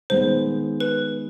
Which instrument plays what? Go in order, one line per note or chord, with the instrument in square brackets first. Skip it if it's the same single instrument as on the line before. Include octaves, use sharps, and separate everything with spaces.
[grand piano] D#3 G#3 B3 [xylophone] C5
[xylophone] B4